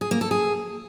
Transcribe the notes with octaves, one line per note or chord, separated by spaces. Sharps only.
G#4
A#3
A4
G#4